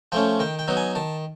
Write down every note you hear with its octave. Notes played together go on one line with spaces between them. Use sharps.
F3 A3 C#4 G5
D#3 G5
G5
F#3 B3 D#4
G#5
D#3 A5